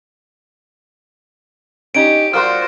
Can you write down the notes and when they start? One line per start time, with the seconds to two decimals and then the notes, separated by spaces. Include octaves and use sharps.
1.94 C#4 D#4 G4 D7
2.34 F3 G3 F4 F#4 A#4 C5 F6